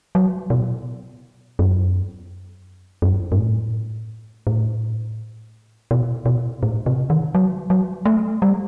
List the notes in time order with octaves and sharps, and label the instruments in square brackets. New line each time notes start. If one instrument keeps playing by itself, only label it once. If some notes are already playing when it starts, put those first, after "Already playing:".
[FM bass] F#3
B2
F#2
F#2
G2
A2
A2
B2
B2
A2
C3
D#3
F#3
F#3
A3
G3